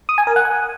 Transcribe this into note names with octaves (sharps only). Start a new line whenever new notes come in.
D#6
G#5
A#4
F#5
G#5